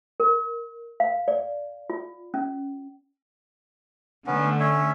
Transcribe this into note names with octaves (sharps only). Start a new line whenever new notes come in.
A#4
F5
D5
F4
C#4
D3 A3 B3 C#4
C#4 C#5 E5